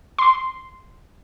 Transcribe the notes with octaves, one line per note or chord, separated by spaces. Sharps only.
C6